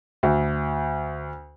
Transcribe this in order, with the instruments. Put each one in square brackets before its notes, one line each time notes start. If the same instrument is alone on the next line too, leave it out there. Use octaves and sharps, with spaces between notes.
[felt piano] D2